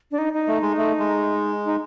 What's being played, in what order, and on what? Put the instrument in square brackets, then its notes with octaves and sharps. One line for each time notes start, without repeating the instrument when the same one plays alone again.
[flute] D4
D#4
D#4
[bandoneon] A3
G#3
A3
G#3
[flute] D#4